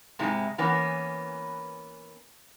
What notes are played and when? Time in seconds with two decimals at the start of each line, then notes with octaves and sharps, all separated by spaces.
0.19 G#2 C3 G#3 E4
0.58 E3 A#3 B3 C#4